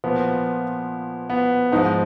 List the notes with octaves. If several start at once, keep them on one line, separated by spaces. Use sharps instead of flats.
A#2 F3 B3
B3
G#2 F3 D#4